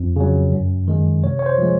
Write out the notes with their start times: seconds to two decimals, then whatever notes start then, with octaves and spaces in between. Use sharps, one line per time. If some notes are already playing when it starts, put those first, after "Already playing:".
Already playing: F2
0.16 C#3 F#3
0.52 F#2
0.88 D#3 G#3
1.23 C3 C#5
1.39 C#5
1.46 C5
1.58 F3 G#3